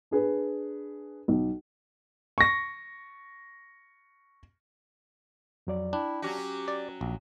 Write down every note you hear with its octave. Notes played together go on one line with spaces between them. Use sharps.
D4 G#4 B4
B1
C#6 A#6
F2 F#3 D5
D4 E4 G5
F#3 C#4 F#4 G4
D5
A#1